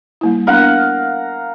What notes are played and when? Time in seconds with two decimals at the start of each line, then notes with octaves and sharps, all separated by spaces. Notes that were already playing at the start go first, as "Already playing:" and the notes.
0.21 G3 A#3 E4
0.47 B3 D4 A#4 F5 F#5